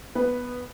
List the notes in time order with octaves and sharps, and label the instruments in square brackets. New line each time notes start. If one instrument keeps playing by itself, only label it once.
[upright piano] B3 B4